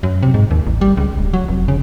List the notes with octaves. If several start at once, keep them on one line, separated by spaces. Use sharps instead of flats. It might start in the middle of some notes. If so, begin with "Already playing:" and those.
F#2
C3
G#2
D#2
A1
G3
C#2
D1
F#3
F1
C#3